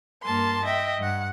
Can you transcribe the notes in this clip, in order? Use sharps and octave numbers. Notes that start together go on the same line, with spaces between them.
G2 A#3 A5 C6
D#5 E5 G5
G2 F#5